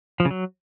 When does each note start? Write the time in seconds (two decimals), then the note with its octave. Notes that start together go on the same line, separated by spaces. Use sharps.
0.20 F3
0.25 C#3
0.31 F#3